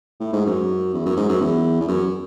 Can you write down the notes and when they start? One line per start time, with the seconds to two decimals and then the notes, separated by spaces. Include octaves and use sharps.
0.20 A2
0.33 G#2
0.46 F#2
0.94 E2
1.06 F#2
1.17 G#2
1.29 F#2
1.41 E2
1.81 E2
1.88 F#2